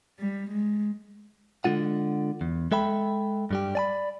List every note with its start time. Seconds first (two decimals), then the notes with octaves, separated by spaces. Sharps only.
0.19 G3
0.51 G#3
1.64 D3 G#3 F4 F#5
2.41 E2
2.71 G#3 A4 E5 G5 B5
3.51 G2 G3 G4
3.75 D5 G#5 B5